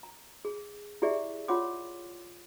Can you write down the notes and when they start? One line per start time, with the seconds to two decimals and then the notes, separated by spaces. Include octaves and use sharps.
0.03 A#5
0.45 G#4
1.02 E4 G4 G#4 D5 E5
1.48 F4 C#5 F#5 C6 D6